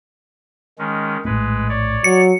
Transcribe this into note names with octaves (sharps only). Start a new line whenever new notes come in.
D#3 G#3 C#4
A#1 A2 G#3 A3 B4
C#5 D5
F#3 C#7